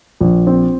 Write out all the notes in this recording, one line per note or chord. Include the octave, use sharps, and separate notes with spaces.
A#1
C4